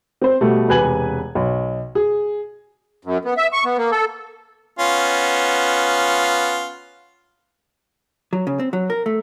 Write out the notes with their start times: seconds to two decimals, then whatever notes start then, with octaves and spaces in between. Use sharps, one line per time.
0.22 C4 C5
0.41 B2 G3 A3
0.68 E1 C3 B4 G#5 G#6 F#7
1.35 B1
1.95 G#4
3.05 F#2
3.25 B3
3.37 E5
3.53 C#6
3.65 B3
3.78 A#3
3.91 A4
4.79 B3 C#4 F4
8.33 F#3
8.47 C#3
8.60 C4
8.73 F#3
8.90 A#4
9.06 A3